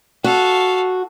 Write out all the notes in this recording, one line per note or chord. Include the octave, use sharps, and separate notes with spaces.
F#4 A4 F5